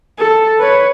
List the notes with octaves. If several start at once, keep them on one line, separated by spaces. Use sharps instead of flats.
A4
B4 C#5